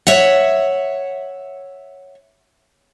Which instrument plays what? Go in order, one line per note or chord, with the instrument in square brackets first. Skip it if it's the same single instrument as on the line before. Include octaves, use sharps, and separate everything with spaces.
[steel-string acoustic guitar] C#5 E5 F#5